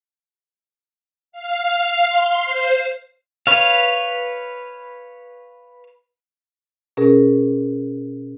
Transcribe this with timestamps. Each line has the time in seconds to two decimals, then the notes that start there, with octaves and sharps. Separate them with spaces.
1.32 F5
2.09 C6
2.45 C5
3.47 B4 C#5 F5
6.97 B2 C#4 G#4 A#4